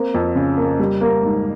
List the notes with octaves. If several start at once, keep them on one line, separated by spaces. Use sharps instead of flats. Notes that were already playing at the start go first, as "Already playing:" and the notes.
Already playing: A#3 C4
F2
C#3
A#3
G3
A#3
G#2